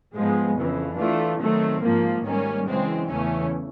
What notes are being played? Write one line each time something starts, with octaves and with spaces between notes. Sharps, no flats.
G#2 F3 G#3 B3
F2 C#3 E3
E3 A3 D4 F4
D#3 F#3 A3 C4
G#2 F3 A#3
G#2 D#3 G3 A#3 C#4
F#2 C#3 E3 G#3 C4
E2 C#3 E3 A3 C#4